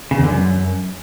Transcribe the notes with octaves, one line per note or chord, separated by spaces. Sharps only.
C#3
E2
D3
F#2